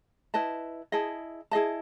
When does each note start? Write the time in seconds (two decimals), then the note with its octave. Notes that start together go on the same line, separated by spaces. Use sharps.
0.34 E4 B4 D#5 A5
0.92 E4 G#4 D#5 A5
1.51 E4 G#4 D#5 A5